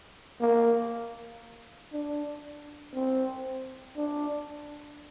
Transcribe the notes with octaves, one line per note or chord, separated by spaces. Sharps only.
A#3
D4
C4
D4